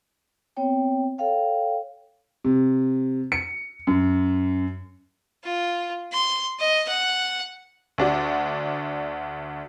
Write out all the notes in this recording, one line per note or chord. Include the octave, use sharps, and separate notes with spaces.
B3 C4 C#5 G5
A4 C#5 F5 G5
C3
C#7
F#2
F4
C6
D#5
F#5
D2 D4 F#4